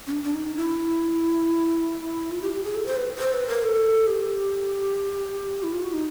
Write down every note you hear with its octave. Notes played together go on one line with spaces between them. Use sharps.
C#4
D4
D4
D#4
E4
F4
G4
G4
G#4
A4
C5
B4
C5
B4
A#4
A4
G4
E4
F4
F#4
D#4